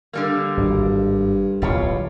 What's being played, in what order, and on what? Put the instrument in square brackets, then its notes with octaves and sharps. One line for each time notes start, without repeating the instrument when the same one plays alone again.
[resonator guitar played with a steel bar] D3 G3 A#3
[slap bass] G#1 [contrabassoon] G2
[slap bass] D1 B1 D3 [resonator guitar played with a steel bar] G3 F4 C#5